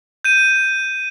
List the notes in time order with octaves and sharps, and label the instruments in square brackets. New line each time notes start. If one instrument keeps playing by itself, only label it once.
[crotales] G6 D#7